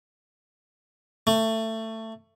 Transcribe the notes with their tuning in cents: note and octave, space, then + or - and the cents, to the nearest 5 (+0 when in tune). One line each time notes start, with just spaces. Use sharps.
A3 +20